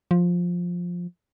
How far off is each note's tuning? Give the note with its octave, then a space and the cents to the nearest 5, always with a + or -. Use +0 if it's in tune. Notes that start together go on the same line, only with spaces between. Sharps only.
F3 +10